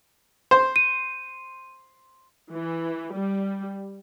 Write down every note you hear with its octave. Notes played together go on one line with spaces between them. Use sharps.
C5
D#7
E3
G3